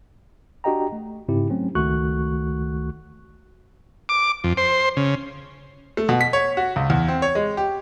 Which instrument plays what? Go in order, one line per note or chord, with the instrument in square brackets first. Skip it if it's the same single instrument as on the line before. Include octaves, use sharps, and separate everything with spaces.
[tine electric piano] D4 F#4 G4 D#5 G5 A#5
A3
G#2 C#3 C4 E4 G4
F#3 A3 C4 C#4
C#2 D#3 A3 F#4 C#6 F#6
[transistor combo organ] D6
F2
C5
C#3
[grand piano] A3
B2
B6
C#5
F#4
C#2
E2
C4
C#5
G#3
G4